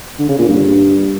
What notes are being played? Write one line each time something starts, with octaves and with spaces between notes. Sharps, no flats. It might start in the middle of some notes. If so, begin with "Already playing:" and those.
D3
C#3
A#2
G2